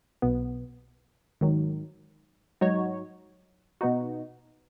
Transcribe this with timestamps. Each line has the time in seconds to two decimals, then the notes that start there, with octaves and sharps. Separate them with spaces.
0.22 B1 B2 B3
1.41 G#1 G#2 D#3 F#3
2.61 G#2 F#3 D#4 F#4 C#5
3.81 B2 B3 D#4 F#4